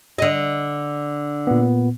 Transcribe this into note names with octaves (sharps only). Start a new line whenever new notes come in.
D3 D#5
A#2 B3